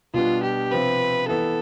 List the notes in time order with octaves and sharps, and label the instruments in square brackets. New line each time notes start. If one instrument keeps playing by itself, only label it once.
[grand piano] B2 G3 B3 D4 [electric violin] F4
[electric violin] G4
[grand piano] C3 F3 C4 [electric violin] B4
[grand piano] E3 B3 E4 [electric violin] A4